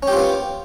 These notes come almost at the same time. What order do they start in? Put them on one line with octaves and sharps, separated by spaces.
C#4 G4 F4 B3